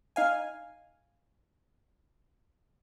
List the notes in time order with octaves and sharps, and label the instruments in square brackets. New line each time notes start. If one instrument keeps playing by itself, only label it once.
[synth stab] D#4 F5 G#5